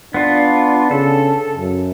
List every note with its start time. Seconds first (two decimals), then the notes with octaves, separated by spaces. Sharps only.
0.14 B3 D4 F4
0.91 C#3 A4
1.57 F#2